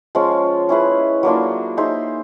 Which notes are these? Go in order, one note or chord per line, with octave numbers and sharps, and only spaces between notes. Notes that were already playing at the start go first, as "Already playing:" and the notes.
F3 G#3 C#4 F4
C#4 E4 G#4 B4
F#3 A#3 D4 F4
D#4 G#4 C5 E5